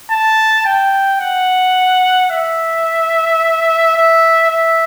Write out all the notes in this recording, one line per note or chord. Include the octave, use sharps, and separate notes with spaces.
A5
G5
F#5
E5
E5
E5